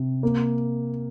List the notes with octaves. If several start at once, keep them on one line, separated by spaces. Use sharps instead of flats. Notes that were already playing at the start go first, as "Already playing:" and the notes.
Already playing: C3
A#3